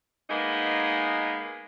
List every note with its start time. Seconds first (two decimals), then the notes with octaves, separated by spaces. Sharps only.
0.30 G#3 A#3 B3 D#4